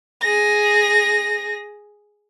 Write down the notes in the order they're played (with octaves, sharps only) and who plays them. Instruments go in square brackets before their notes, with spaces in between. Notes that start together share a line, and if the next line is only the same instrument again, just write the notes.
[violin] G#4 A#6